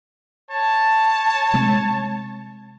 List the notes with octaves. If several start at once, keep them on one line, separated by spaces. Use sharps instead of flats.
C#5 A5
C3 G#3 C4